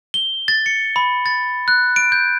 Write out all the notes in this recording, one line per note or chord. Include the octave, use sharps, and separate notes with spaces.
G7
A6
C#7
B5
A6
F#6
D7
G6